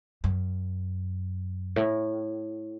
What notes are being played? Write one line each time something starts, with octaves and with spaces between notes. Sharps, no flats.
F#2
A2